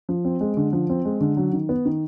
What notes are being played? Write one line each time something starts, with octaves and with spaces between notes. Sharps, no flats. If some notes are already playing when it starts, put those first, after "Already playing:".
F3
C4
G#3
D3
F3
C4
G#3
D3
F#3
D#3
B3
D#3